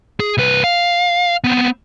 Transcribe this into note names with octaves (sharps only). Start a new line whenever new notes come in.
G#4
C2 B4
F5
B3 C4